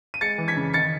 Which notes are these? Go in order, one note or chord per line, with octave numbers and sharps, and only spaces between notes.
D#7
G#3 A6 C#7
E3
G#6 B6
C#3
D#3 A6 C#7